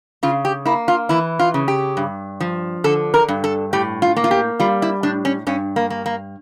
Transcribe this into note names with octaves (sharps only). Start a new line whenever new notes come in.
C#3 F4
G4
A#3 E4
F4
E3 E4
F4
C#3
G4
G2
F3
D3 A4
A#4
G2
A4
A2 G4
F4
A#3
F4
G4
G3 F4
E4
A2 D4
C#4
G2 C#4
A#3
A#3
A#3